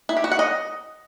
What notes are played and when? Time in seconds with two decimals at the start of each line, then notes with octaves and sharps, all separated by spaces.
0.09 E4
0.17 G4
0.24 F#4
0.31 F#5
0.39 D#5